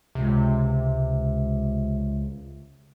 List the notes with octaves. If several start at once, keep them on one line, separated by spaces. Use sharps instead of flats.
C#2 C3